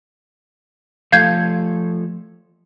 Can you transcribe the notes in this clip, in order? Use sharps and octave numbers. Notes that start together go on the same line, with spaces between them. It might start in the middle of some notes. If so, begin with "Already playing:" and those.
F3 A3 A4 F5 G6 G#6